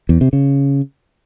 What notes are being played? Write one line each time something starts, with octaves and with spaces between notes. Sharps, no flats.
E2
C3
C#3